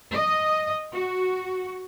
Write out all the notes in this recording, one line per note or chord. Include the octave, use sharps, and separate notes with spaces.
D#5
F#4